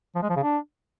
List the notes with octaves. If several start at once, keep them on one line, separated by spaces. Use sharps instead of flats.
F3
G#3
F3
C#3
D4